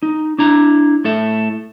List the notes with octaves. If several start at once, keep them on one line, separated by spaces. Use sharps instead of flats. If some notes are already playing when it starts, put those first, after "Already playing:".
D#4
D4 E4 A#5
A2 A4 E5